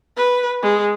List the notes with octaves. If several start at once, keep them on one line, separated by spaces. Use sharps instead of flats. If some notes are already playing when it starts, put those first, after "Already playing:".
B4
G#3